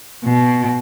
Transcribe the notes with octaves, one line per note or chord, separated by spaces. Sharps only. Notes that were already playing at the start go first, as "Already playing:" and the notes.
B2